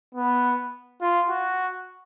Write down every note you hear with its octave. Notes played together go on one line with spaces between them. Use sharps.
B3
F4
F#4